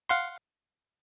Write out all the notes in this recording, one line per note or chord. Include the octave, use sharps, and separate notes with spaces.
F5 F#5 C6